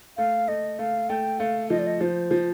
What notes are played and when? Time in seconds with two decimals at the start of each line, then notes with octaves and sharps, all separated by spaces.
0.18 A3 F5
0.48 A3 D#5
0.79 A3 F5
1.09 A3 G5
1.40 A3 F5
1.70 F3 D#5
1.79 D5
1.87 D#5
2.01 F3 C5
2.31 F3